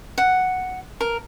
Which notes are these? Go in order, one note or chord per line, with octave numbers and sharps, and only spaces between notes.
F#5
A#4